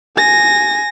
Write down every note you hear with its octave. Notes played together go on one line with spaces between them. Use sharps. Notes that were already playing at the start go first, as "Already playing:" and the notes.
G#5 A#6